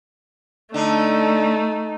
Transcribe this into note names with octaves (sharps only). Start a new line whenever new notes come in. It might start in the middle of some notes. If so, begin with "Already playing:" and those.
D3 A3 D4 D#4